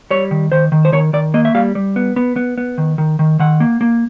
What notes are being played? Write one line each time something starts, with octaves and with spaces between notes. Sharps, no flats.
G3 C#5
D#3
D#3 C5
D#3
C5
D#3 C#5
D#3 D5
A#3 D#5
E5
G3 F5
G3
B3
B3
B3
B3
D#3
D#3
D#3
D#3 F#5
A#3
A#3